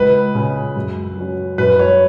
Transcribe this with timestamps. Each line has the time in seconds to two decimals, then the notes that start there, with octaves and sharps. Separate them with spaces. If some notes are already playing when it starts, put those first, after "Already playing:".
Already playing: C#2 B4
0.35 C#3 G#3
0.76 F#2
1.18 F#3 C#4
1.58 F#2 B4
1.79 C#5